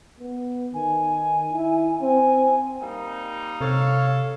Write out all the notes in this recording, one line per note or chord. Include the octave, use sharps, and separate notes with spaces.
B3
D#3 G#5
E4
C4 G#5
G3 A#3 D#4
C3 A4 C#5 F5